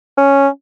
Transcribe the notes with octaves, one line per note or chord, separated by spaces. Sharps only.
C#4